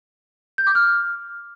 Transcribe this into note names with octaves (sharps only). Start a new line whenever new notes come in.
G6
D6
F6